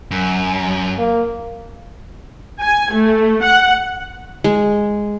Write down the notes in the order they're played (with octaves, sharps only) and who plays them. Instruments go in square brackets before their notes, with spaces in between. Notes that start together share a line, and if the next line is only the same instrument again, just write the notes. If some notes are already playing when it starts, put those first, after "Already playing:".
[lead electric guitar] F#2
[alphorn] A#3
[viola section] G#5
A3
F#5
[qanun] G#3